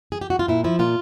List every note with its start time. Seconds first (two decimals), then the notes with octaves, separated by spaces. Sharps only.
0.12 G#4
0.21 G4
0.30 F#4
0.39 F4
0.48 A#2 E4
0.64 F3 E4
0.79 A#2 F4